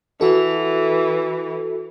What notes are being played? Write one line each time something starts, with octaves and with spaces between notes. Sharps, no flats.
E3 F#4 A4